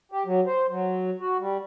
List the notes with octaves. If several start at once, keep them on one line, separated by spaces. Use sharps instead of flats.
G4
F#3
C5
F#3
F#4
G3